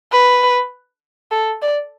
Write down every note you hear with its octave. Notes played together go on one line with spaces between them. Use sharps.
B4
A4
D5